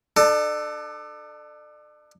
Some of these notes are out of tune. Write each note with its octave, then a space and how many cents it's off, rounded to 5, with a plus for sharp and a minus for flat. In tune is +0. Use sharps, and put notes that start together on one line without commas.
D4 +35 A4 +0